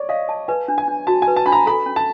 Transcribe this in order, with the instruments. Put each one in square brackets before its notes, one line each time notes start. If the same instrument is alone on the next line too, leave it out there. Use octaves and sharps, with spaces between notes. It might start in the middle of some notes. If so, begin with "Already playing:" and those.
Already playing: [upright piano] C#5 D5
[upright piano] D#5 [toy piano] F5
[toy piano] A5
[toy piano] B4 [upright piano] G#5
[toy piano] D4
[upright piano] G#5
[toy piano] D4
[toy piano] F#4 [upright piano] A5
[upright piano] G#5
[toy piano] B4
[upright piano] A5
[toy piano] D4 [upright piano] B5
[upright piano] A#5
[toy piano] A4 [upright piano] B5
[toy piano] C#4
[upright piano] A5